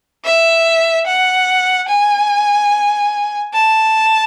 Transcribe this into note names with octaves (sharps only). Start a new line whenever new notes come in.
E5
F#5
G#5
A5